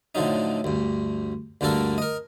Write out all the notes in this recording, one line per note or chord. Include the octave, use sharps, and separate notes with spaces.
A2 D3 F3 F#3 D#4
D2 G2
D2 G2 D3 A#3 A4 A#4
A#4 D#5